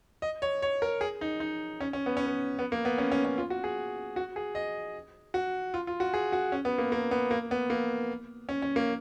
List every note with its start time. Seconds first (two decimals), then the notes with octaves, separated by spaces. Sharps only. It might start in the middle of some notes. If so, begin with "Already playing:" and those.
0.22 D#5
0.42 C#5
0.62 C#5
0.82 A#4
1.01 G#4
1.21 D#4
1.40 D#4
1.81 C#4
1.93 C#4
2.06 B3
2.17 C#4
2.26 B3
2.59 B3
2.72 A#3
2.85 B3
2.98 C#4
3.12 C#4
3.25 C#4
3.38 F4
3.50 F#4
3.64 G#4
4.16 F#4
4.36 G#4
4.55 D#5
5.34 F#4
5.74 F4
5.87 F4
6.00 F#4
6.14 G#4
6.32 F#4
6.52 C#4
6.65 B3
6.78 A#3
6.92 A#3
7.11 B3
7.31 A#3
7.51 B3
7.70 A#3
8.49 C#4
8.62 C#4
8.76 A#3